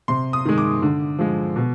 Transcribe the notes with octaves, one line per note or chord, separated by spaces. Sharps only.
C3 C6
D#6
D#3 G#3
D6
D3
F3 G#3
B2